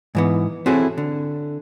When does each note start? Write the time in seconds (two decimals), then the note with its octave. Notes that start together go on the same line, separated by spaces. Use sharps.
0.15 G#2 E3 B3
0.66 C4 E4 F#4 G#4 A4 C#5
0.98 D3